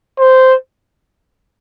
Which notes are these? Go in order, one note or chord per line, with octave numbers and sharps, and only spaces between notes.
C5